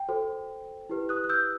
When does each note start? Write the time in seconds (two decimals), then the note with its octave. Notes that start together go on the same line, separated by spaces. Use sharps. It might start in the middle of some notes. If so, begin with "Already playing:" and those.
Already playing: G5
0.09 F#4 A4 C5
0.89 E4 G4 B4
1.09 D#6 F#6
1.24 F#6
1.29 E6 G6